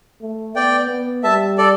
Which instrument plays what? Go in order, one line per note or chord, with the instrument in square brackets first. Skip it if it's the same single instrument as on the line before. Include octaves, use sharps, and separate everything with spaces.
[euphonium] A3
[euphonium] B3 [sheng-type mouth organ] D5 G5
[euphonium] B3
[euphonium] G3 [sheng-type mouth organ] E5 A5
[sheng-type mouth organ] A4 D5